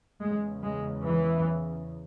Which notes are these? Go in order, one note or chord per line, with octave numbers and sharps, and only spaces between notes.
E2 C#3 G#3
G#3
E3